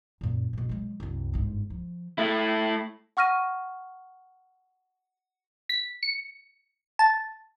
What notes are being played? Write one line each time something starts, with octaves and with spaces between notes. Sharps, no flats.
F#2 A#2
F#2 B2
F#3 G#3
C2 F#2
G1 G#2
F3
A3 E4
F#5 C#6 F6 A#6 D#7
B6
C#7
A5